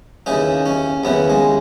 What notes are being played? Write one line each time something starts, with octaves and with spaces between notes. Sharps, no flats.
D#2 C#3 E3 D#4
C#4
D#2 C#3 E3 B3
G#3